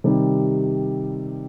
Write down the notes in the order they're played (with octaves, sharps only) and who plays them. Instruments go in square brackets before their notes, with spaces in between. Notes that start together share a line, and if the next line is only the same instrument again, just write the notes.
[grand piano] C3 D#3 G3